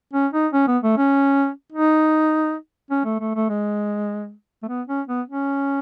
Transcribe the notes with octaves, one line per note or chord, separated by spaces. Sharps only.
C#4
D#4
C#4
B3
A3
C#4
D#4
C#4
A3
A3
A3
G#3
A3
B3
C#4
B3
C#4